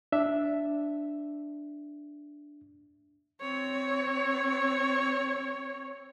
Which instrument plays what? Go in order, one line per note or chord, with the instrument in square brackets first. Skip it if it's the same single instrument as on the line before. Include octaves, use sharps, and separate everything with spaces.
[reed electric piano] D4 E5
[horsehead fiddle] C4 C#5